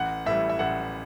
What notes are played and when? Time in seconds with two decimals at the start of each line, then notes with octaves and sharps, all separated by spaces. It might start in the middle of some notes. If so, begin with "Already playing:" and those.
Already playing: A1 F#5
0.26 A2 E3 G3 E5
0.49 E5
0.59 A1 F#5